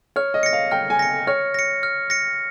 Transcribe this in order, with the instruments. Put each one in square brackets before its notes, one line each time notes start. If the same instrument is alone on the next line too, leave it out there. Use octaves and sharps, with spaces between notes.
[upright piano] C#5 [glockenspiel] F6
[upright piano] D#5
[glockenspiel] A#6 C#7
[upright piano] F5
[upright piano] G5 [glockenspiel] F6
[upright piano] G#5
[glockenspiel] A#6 C#7
[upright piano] C#5 [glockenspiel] F6
[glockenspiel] A#6 C#7
F6
A#6 C#7